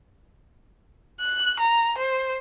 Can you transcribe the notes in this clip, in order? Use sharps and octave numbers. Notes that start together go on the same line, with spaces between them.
F#6
A#5
C5